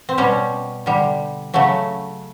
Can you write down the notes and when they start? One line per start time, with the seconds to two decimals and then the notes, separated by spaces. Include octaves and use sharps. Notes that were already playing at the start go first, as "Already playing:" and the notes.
0.09 C4
0.18 B2 G3 C#4
0.86 D3 G3
1.54 C#3 F#3 A3